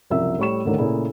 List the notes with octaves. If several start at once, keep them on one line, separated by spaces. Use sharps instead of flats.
F#1 C2 F3 E5 E6
A2 G3 C#6 E7
D#2 A2 D3 D#3 A3 A#3
A#2 C#3 A3 E4 G#4